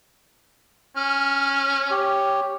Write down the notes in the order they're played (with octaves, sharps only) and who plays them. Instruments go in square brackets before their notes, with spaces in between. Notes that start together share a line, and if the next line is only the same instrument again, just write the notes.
[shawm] C#4 [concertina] F6
[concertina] G4 C#5